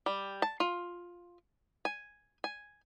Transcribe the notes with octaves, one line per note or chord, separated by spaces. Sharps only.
G3
A5
F4
G#5
G#5